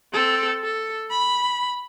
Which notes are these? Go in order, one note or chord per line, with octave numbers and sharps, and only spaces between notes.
C4 A4
A4
B5